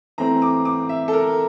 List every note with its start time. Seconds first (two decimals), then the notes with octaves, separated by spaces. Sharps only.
0.18 E3 A3 C4 A#5
0.42 D6
0.65 D6
0.89 E5
1.08 A4
1.13 A#4